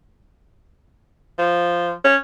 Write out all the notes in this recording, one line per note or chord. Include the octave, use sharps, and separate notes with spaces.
F3
C#4